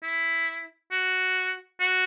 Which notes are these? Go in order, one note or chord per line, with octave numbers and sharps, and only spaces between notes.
E4
F#4
F#4